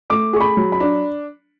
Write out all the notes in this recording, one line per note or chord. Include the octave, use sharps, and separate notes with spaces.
A3 D6
G#4 C#6
B5
F#3
B5
D4